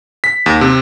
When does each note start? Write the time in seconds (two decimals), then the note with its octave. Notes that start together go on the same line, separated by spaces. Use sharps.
0.24 B6
0.46 D#2
0.61 C3 C4